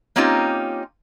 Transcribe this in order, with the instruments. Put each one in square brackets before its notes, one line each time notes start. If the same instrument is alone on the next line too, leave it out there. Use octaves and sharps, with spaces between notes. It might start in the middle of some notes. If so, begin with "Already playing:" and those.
[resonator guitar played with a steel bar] A#3 C4 C#4 D#4 F4 G4